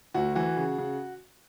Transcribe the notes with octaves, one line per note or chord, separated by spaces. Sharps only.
D2 F#4
E3 F#4
C#3
C#3